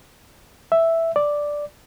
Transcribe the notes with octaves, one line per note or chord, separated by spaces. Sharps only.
E5
D5